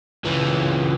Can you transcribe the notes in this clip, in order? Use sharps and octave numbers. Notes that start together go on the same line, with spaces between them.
C#2 E3